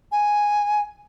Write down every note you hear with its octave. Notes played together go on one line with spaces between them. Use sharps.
G#5